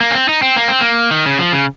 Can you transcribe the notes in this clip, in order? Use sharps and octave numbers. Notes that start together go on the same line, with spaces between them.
A#3
C#4
C4
D#4
C4
A#3
C4
A#3
D#3
C#3
F3
C#3